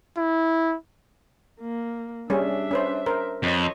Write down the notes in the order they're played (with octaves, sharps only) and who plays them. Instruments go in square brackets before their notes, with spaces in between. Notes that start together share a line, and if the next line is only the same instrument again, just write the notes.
[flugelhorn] E4
[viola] A#3
[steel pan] G3 C#4 G#4 [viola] D4 E5
[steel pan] C#4 B4 C5
A#4 C5
[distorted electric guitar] F2 [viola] C#5 D#5